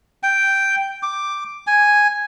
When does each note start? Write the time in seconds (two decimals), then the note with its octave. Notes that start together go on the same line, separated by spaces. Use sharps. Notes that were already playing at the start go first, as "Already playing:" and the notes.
0.23 G5
1.03 D6
1.67 G#5